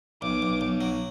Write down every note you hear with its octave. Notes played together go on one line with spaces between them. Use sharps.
B1 D6
B1
B1
F#3